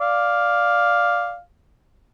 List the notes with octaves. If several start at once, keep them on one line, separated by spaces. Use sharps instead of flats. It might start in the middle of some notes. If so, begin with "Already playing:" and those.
D5 F5